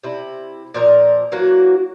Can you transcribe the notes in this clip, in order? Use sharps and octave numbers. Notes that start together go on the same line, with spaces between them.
C3 E4
A#2 F3 A#4
E3 F#3 A#3 F#4